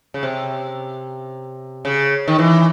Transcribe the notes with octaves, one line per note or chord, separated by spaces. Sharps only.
C#3
C3
C#3
D#3
E3